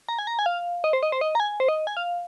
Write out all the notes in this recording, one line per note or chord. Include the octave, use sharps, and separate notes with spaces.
A#5
G#5
A#5
G#5
F5
D#5
C5
D#5
C5
D#5
A#5
G#5
C5
D#5
G#5
F5